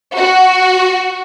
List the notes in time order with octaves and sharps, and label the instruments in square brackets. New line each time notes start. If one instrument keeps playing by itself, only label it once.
[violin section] F#4